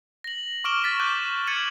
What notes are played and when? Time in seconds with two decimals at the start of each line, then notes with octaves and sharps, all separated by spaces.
0.24 A#6 F#7
0.64 C#6 D6 F6 D7 E7 G7
0.82 F6 A6 B6 D7 E7
1.00 D6 F#6 G6 D#7 G7
1.47 F6 G#6 A6 C#7 D#7 F#7